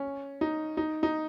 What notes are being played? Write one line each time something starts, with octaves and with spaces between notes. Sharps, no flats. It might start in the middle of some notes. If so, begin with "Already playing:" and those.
Already playing: C#4
D#4
D#4
D#4